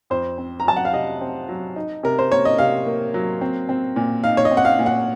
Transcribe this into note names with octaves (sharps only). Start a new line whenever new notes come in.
F2 C5
C4
A#5
F#3 A5
F#5
F5
C3 D#5
C4
F#3
D#4
C3 A#4
C5
A#3 C#5
D#5
C3 F5
A#3
F#3
C4
C4
A#2
D#4 F5
C#5
D#5
C4
F#5
F5
A#2
F#5